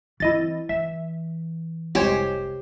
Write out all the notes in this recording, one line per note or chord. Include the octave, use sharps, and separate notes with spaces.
E3 C4 E4 D#5 A6
E3 E5
F1 C2 G#3 G4 C5 C#5